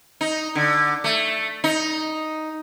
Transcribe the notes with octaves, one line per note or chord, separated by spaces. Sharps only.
D#4
D3
A3
D#4